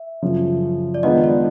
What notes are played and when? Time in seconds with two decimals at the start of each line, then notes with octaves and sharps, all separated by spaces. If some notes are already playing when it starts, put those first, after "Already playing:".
Already playing: E5
0.22 F#2 C#3 F3
0.94 D5
1.03 D#3 G#3 B3 D4 F4 D#5
1.24 D5